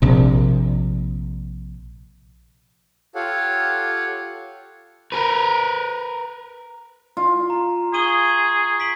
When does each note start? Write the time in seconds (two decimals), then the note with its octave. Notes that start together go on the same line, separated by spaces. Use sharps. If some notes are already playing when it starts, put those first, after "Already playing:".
0.02 A#1 C3
3.15 F4 G4 A4 C#5 F5 F#5
5.12 A#4 B4
7.17 F4
7.50 A#5
7.94 G#4 C#6 D#7 G7
8.80 B6 D7 F#7